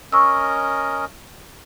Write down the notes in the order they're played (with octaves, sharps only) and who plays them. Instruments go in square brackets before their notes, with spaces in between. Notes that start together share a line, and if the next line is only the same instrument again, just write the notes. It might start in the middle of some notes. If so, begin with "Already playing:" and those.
[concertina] C#4 A#4 D#5 [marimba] C#6 E6